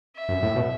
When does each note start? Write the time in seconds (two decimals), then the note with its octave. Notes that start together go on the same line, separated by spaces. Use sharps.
0.16 E5
0.29 F#2
0.43 A2
0.56 B2